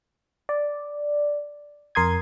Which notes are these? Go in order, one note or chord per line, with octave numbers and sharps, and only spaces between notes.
D5
F2 A#4 C6 D#6 G#6